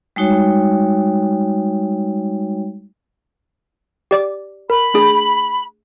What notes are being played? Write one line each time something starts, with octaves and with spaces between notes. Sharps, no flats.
G3 G#3 D#4 F#4 C#5 G5
G4 D5 D6
A#4 B5
A3 D4 G#4